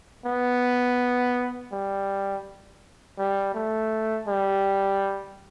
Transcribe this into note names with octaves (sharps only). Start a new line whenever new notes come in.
B3
G3
G3
A3
G3